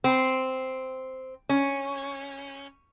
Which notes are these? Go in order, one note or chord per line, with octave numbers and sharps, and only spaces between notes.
C4
C#4